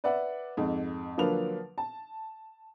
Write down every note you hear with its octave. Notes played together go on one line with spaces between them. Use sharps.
B4 D5 E5 F#5
F2 G#2
D3 F3 F#3 A#3 B4 F7
A5